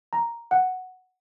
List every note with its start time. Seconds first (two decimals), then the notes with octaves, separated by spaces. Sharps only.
0.13 A#5
0.51 F#5